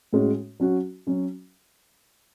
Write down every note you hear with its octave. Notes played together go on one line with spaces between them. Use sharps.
A2 G#3 C#4 F#4
F#3 C#4 F#4
F#3 C#4 F#4